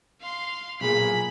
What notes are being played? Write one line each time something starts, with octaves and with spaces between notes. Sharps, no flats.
F5 C6
B1 A#2 G#4 B5